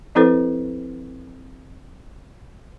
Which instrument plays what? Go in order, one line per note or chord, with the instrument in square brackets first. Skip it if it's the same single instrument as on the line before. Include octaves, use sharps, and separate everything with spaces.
[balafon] F3 C4 E4 A4 B4 C5